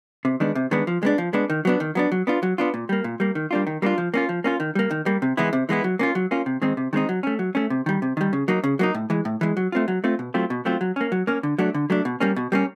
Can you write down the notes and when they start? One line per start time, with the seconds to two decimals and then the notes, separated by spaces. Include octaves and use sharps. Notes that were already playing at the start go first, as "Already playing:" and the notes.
0.25 C3
0.40 D#3 G#3 B3 D4
0.55 C3
0.71 D#3 G#3 B3 D4
0.87 F3
1.03 G#3 B3 D4
1.18 F3
1.33 G#3 B3 D4
1.50 D#3
1.65 F#3 B3 D4
1.80 D#3
1.95 F#3 B3 D4
2.12 F#3
2.27 B3 D4 F4
2.43 F#3
2.58 B3 D4 F4
2.74 A#2
2.89 G3 A#3
3.04 A#2
3.20 G3 A#3
3.35 D#3
3.51 G3 A#3 D4 F4
3.67 D#3
3.82 G3 A#3 D4 F4
3.98 F3
4.14 A#3 C#4 F4
4.29 F3
4.44 A#3 C#4 F4
4.60 D#3
4.75 G3 A#3
4.91 D#3
5.06 G3 A#3
5.22 C3
5.37 E3 G#3 B3 E4
5.53 C3
5.69 E3 G#3 B3 E4
5.84 F#3
5.99 A#3 C#4 F4
6.15 F#3
6.31 A#3 C#4 F4
6.46 C3
6.62 D#3 G#3 C4 D#4
6.77 C3
6.93 D#3 G#3 C4 D#4
7.09 F#3
7.23 A3 C#4
7.39 F#3
7.55 A3 C#4
7.70 C3
7.86 D#3 G3
8.02 C3
8.17 D#3 G3
8.33 C#3
8.48 F#3 A#3 D#4
8.64 C#3
8.79 F#3 A#3 D#4
8.95 A2
9.10 E3 G#3
9.25 A2
9.41 E3 G#3
9.57 F#3
9.72 A3 C4 F4
9.88 F#3
10.04 A3 C4 F4
10.19 B2
10.34 F#3 A3 C4 F4
10.50 B2
10.65 F#3 A3 C4 F4
10.81 F#3
10.96 A#3 C#4
11.12 F#3
11.27 A#3 C#4
11.43 D3
11.58 F#3 A3 D4
11.74 D3
11.90 F#3 A3 D4
12.05 B2
12.20 G3 A#3 C#4
12.36 B2
12.52 G3 A#3 C#4